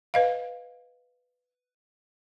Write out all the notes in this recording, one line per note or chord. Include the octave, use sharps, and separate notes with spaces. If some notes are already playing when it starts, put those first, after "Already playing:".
B4 D#5 F5